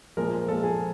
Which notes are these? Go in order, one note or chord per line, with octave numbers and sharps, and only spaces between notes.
A#2 F3 G#3 A#4
A#2 F3 G#3 A4
G#4